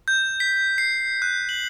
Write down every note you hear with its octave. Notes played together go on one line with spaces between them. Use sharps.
G6
B6
C7
F#6
F#7